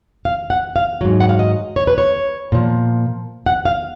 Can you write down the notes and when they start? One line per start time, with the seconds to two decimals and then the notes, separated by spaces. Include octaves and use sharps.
0.25 F5
0.50 F#5
0.76 F5
1.01 G#2 F#3
1.20 F#5
1.29 F5
1.39 D#5
1.76 C#5
1.87 B4
1.98 C#5
2.52 A#2 F3
3.46 F#5
3.65 F5